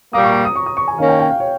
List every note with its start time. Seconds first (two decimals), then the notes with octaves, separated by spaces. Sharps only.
0.13 A#2 G3 A#3 D#6
0.24 C#6
0.34 A#5
0.45 D#6
0.56 C#6
0.66 D#6
0.77 C#6
0.88 G#5
0.98 D#3 A#3 C#4 F5
1.09 G5
1.19 G5
1.30 F5
1.40 C#5